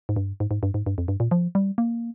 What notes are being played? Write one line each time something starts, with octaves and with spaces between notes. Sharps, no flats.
G#2
G2
G#2
G#2
G2
G#2
G2
F2
G2
A#2
F3
G3
A#3